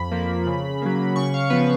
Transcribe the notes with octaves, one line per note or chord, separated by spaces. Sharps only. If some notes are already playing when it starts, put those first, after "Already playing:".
Already playing: F2 B5
F3 A#3
C#3
F#3 A#3
C#3 C#6
F5
F3 B3 B4